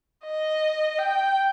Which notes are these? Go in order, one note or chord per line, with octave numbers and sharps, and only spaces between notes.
D#5
G5